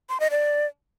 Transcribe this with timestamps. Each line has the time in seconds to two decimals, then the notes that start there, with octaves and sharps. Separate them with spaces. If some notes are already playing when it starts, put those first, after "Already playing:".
0.09 C6
0.20 D#5
0.31 D5